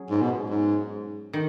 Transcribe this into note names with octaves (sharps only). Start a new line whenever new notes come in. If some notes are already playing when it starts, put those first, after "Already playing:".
Already playing: F#3 C#4 G#4
G#2
B2
G#2
D#3